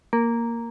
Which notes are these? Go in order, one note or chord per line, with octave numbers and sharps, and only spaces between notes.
A#3